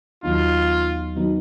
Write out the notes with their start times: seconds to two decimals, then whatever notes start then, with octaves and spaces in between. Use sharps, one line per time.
0.23 D#2 D#3 F#3 B3 D#4 F4
1.16 D#3 F#3 B3 D#4